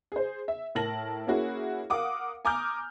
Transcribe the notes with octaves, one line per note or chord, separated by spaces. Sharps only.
G#4 C5
E5
A2 A#4 A5 A#6 F#7
A#3 C#4 E4 F#4 G#4
A#4 F5 F#5 D6 D#6
G#5 A#5 D6 D#6 F6 G6